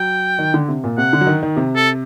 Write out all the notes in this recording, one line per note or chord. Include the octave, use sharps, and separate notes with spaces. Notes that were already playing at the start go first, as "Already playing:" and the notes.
Already playing: F#3 G5
D#3
D3
C3
A#2
C3 F#5
D3
F#3
D#3
D#3
C3
A4